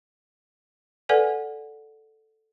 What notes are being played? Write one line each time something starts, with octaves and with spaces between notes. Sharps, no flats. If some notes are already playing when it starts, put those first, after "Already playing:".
A4 B4 D5 F#5 G#5